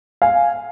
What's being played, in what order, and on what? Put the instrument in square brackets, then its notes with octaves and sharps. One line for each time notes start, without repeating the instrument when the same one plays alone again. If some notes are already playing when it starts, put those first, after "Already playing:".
[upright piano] F5 G#5